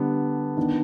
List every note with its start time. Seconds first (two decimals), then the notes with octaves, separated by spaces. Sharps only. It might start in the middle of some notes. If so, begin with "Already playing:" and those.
Already playing: D3 G3 B3 D4
0.57 D#3 B3 D4